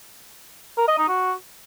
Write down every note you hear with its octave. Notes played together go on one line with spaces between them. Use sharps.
A#4
D#5
D#4
F#4